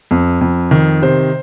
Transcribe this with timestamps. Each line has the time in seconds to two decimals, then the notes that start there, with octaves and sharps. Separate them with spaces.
0.11 F2
0.41 F2
0.71 D#3
1.02 C3 C5